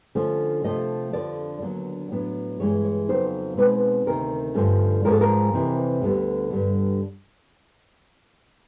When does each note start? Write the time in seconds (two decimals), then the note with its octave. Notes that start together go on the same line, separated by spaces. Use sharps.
0.15 D3 F3 A3 C#4
0.64 C3 F3 A3 D#5
1.13 F2 D3 F3 D5
1.62 D#2 D3 F#3 B3 D4
2.11 A2 F#3 B3 D4
2.60 G2 E3 G#3 C#4 C#5
2.84 C#5
3.09 F2 C#3 F#3 B3 D#4 C5
3.57 B2 G#3 C4 D#4 B4
4.06 D2 C3 D#3 A#4
4.55 G2 D3 F3 A3 C#4
5.04 G#2 F3 G#3 C#4 A#4
5.12 A4
5.21 A#4
5.53 F2 C3 E3
6.02 D2 D3 G3 B3
6.50 G2 D3 G3